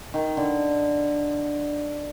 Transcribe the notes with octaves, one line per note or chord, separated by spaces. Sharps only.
D#3
D3